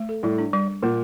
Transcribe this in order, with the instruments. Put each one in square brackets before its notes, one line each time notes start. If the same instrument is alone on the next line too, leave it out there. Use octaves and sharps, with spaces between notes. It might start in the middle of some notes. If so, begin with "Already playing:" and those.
Already playing: [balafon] A3
A4
[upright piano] A2 [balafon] G3
[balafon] D4
G3
G3
[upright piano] A#2 [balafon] A#3